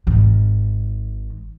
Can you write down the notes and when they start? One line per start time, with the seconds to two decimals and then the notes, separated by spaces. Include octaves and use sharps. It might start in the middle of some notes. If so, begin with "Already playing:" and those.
0.07 G#1 D#3